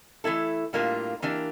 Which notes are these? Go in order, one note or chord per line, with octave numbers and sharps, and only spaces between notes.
E3 A3 E4 A4
A2 G3 A#3 D4 F4
E3 A#3 D4 G4